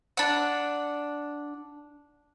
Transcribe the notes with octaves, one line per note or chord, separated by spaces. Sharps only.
D4 F#5